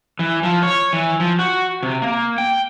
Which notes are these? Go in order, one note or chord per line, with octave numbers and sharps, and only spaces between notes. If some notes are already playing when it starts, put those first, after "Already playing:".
E3
F3
C#5
E3
F3
F#4
C3
A#3
G5